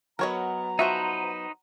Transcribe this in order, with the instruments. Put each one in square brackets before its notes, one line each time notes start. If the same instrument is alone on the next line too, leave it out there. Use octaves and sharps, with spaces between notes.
[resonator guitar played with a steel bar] F#3 B3 [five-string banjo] A#4 C#5 D#5 [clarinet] A#5
[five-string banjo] F3 F#4 E5 [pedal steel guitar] D#4 B4 C5